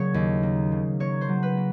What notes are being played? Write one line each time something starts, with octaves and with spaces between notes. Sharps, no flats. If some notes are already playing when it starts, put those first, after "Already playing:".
Already playing: C#3 F#3 A#3 C#5
D#2
A#3
C#3
A#3 C#5
C5
F#3
B4
A#3